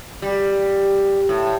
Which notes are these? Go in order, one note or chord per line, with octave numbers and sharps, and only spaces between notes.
G3
A2